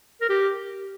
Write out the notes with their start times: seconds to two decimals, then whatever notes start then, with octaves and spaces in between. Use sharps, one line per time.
0.21 A#4
0.29 G4